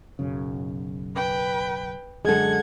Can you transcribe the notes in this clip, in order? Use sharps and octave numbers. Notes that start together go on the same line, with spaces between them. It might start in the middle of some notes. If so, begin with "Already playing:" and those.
B1 F#2 C#3
B4 G5
F#2 D3 G#3 A4 F#5 G#6